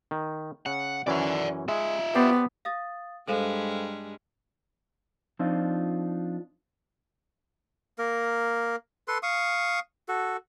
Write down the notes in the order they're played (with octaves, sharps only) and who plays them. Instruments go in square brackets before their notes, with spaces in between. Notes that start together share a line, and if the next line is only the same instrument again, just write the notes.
[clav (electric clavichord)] D#3
[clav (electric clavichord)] C#3 [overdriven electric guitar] F#5
[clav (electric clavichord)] F#2 E3 C#4 [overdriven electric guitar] D5 F#5
[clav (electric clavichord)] G#3 [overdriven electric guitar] F4 E5
[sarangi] B3 [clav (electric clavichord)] G4 C5 D5
[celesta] F5 D#6 A6
[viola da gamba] G2 G3 G#3 [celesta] A4 C5 F5
[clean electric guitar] F3 C4 D4 D#4 F4
[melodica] A#3 A#4
A4 B4 C6
F5 C#6 D#6
F#4 A4